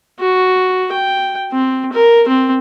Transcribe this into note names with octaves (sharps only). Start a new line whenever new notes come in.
F#4
G5
C4
A#4
C4